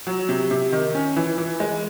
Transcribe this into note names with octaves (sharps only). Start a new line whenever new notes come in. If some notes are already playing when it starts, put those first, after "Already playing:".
F#3
C3
C3
D#3
C#4
E3
E3
G#3